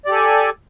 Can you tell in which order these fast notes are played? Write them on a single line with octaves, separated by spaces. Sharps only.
D5 G4 A4 G#5